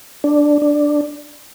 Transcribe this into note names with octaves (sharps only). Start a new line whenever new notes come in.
D4
D4